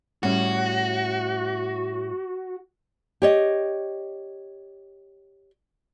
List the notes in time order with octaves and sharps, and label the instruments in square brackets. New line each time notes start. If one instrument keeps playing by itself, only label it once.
[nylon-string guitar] A2 G3 C#4 [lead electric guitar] F#4
[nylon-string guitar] G4 C#5 D#5